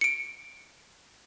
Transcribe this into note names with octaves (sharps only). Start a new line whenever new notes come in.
C#7 D7